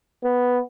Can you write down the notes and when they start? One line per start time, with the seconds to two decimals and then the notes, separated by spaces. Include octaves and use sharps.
0.24 B3